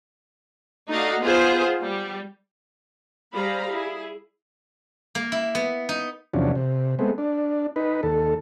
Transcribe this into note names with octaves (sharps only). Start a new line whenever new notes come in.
A3 D#4 F#4 D5 D#5 F5
B3 F4 G#4 C5
G3
G3 G#4 C5 F5 A#5 B5
E4 G#4
A#3
E4
B3
D#4
E2 C3 F3 F#3 C#4 D4
C3
G#3 A3 B3 C4
D4
D#4 B4
D#2 A4